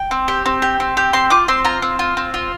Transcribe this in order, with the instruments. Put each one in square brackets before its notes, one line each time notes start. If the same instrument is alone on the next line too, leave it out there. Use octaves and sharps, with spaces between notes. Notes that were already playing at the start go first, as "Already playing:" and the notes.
Already playing: [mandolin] G5
C4
G4
C4
G4
C4
G4
C4 C6
F4 D6
C4 C6
F4 A#5
C4
F4
C4
F4